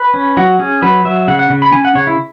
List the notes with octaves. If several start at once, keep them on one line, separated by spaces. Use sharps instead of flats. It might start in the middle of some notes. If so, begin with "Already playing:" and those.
Already playing: B4
C#4
F#3 F#4
C#4 G#4
F#3 B4
F#3 E5
C#3 F#5
F#5
C#3
B5
C#4 G#5
F#5
C#3 C#5
E4